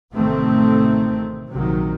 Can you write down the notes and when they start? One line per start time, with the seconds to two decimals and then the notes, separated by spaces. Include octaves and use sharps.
0.15 A1 C3 D#3 A3 C4
1.52 A#1 C3 D#3 F#3